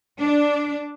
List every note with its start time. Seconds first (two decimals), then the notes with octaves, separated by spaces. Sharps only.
0.20 D4